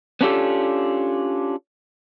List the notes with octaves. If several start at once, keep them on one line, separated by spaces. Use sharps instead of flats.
B3 C#4 D4 F4 G4 A4